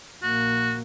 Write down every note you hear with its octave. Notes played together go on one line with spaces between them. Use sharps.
A#1 A#3 F#4